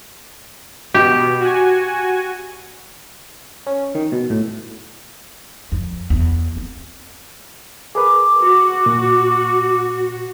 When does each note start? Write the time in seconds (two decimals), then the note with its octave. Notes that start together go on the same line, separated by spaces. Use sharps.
0.94 B2 G4
1.40 F#4 G#5
3.67 C#4
3.95 D#3
4.12 B2
4.30 A2
5.72 F2
6.10 E2
6.56 C4
7.95 G#4 A#4 B4 D6
8.42 F#4
8.86 A#2